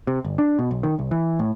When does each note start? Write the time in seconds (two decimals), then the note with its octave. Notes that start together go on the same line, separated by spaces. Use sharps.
0.07 C3
0.25 G1
0.38 D4
0.59 B2
0.71 B1
0.83 D#3
0.99 C2
1.11 E3
1.39 A2